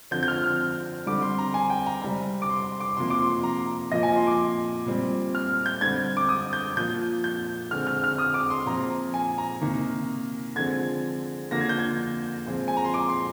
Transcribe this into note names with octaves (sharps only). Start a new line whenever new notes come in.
D3 F3 C4 G6
G6
F6
F6
D3 G3 C4 D6
C6
A#5
G#5
G5
A#5
C3 G3 C4
D6
C6
D6
C3 F3 A#3 C6
D6
C6
A#5
A#2 F3 A#3 D#5
G#5
C6
D6
A#2 G3 C4
F6
G6
D3 G3 C4 G#6
D6
D#6
G6
A#2 F3 A#3 G6
G6
D3 G#3 C4 F6
F6
F6
D#6
D6
C6
A#2 F3 C4 A#5
G#5
A#5
C3 D#3 A#3
D3 F3 G#3 C4 G#6
D3 F3 A#3 A#6
G#6
G6
G#6
A#2 F3 G#3 C4
G#5
A#5
C6
D6
C6